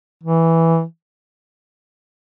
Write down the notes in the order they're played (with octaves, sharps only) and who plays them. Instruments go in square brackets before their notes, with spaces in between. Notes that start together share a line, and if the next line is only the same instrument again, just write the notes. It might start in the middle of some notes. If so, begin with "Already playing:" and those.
[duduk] E3